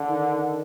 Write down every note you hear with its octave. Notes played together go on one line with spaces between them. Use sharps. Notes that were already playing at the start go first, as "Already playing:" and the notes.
Already playing: D3
D#3